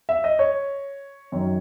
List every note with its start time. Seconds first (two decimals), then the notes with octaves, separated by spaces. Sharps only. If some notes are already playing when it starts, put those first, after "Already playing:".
0.09 E5
0.24 D#5
0.39 C#5
1.32 F#2 D#3 F#3